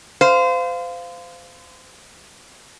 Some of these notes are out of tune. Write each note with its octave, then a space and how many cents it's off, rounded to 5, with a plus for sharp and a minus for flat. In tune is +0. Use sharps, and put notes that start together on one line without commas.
C5 -30 F5 +0